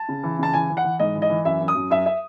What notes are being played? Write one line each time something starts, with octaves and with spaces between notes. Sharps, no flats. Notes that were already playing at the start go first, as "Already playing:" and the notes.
Already playing: A5
C#3
E3
C#3 A5
E3 G#5
E3
F#5
E3
G#2 D#5
E3
D#5
E3
F#2 E5
F#2
D#6
F#2
F#2 E5
E5